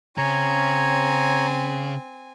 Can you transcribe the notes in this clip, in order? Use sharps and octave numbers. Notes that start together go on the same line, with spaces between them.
C#3 C4 C#5 G#5 A#5